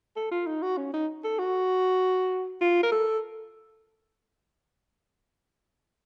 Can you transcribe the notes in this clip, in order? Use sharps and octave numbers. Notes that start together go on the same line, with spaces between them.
A4
F4
D#4
F#4
C#4
D#4
A4
F#4
F4
A#4
A4